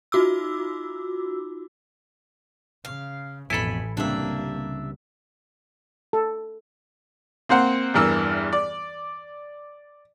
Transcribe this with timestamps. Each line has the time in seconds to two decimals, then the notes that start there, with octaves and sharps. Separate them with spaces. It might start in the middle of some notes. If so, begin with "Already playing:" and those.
0.12 D#4 F4 F#4 D6 E6
2.85 C#3 F5
3.50 A1 F2 B2 E4 A4 G#5 B5
3.97 C#2 C3 G3 A#3 D4 E5
6.13 A4
7.49 A#3 C4 C5 F#5
7.94 E2 G2 E3 A#4 E6
8.53 D5